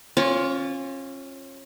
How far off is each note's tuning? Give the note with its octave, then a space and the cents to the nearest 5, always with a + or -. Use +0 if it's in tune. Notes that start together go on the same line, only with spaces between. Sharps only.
C#4 -30 F4 +10 C#5 +35